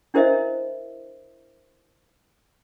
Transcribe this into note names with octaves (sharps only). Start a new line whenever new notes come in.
D4 E4 A#4 C5 D#5 E5